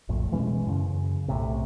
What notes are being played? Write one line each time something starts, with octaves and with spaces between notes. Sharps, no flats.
A#1 F2 A2
B2 E3 G#3 C#4
F#2 C#3
B1 A2 C3